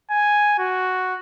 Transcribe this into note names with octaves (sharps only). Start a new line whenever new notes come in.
G#5
F#4